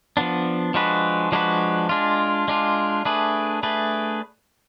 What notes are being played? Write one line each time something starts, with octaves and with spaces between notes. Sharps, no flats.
F3 B3 D4
F3 G#3 D4 F#4 B4
F3 G#3 D4 F#4 B4
G#3 D4 F4
G#3 D4 F4
A3 D4 G#4 B4
A3 D4 G#4 B4